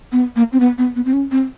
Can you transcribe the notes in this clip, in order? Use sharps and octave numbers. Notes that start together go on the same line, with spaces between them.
B3
A#3
C4
B3
B3
B3
C4
C#4
C4